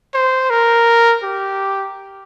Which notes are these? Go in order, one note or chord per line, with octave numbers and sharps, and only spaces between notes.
C5
A#4
G4